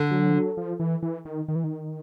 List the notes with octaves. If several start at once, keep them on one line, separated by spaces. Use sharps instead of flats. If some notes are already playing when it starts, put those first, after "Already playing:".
Already playing: D3
F#3
F3
F#3
F3
E3
E3
D#3
D#3
E3
D#3